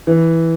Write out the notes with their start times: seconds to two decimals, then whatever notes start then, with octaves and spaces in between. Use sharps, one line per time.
0.07 E3